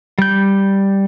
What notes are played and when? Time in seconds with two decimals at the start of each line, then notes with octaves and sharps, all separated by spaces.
0.19 G3 G6